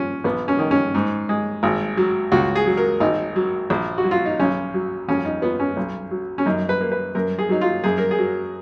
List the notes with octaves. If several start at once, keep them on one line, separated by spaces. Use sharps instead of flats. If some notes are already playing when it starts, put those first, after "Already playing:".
Already playing: F3 C#4
A#1 B3
C#4
D#3
C#4
G#2
G#3
G#1
F#3
C#2 F#4
G#4
F#3
A#4
G#1 D#4
F#3
A#1
F#4
F#3
F4
D#4
B1 C#4
F#3
F2 C#4
D#4
F3 B3
C#4
B1
F#3
C#4
F#2 D#4
B4
A#3
B4
F#2 A#4
G#4
F#3 D#4
F4
F#2 G#4
A#4
G#4
F#3